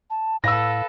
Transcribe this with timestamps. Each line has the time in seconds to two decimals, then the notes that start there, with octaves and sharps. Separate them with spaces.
0.10 A5
0.44 A2 A4 B4 F5 E6 A#6